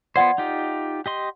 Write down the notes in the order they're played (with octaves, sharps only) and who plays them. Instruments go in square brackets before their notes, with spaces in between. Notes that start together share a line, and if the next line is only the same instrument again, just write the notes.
[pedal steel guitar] B3 F4 C5 [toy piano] D5 F#5 C6
[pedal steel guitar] D#4 F4 G4
G4 D#5 C6